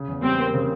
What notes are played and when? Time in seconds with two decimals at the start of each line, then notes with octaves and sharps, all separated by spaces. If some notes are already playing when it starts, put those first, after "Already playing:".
Already playing: C#3
0.08 E2
0.23 G3 C4
0.38 A#3
0.54 C#3